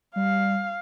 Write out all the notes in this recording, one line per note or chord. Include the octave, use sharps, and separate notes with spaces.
G3 F5